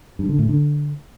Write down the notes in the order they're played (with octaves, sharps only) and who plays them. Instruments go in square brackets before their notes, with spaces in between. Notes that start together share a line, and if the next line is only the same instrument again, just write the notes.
[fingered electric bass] G2
D3
A2
D3